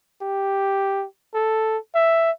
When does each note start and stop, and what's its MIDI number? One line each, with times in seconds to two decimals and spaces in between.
0.22 1.06 67
1.35 1.78 69
1.95 2.31 76